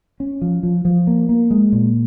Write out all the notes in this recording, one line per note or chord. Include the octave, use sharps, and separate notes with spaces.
C#4
F3
F3
F3
A#3
A#3
G#3
A#2